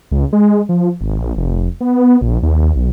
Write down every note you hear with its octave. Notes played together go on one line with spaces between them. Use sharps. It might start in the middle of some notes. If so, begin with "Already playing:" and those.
C#2
G#3
F3
G#1
A#1
F1
B3
A#1
D#2
D#2
B1